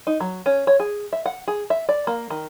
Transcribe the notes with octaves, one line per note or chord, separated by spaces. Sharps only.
D#4
F#3
C#4
C#5
G#4
E5
F#5
G#4
E5
D5
A#3
D#3